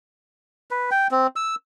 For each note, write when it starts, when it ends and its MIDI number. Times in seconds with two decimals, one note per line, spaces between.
0.71 0.90 71
0.91 1.07 79
1.11 1.27 60
1.36 1.55 88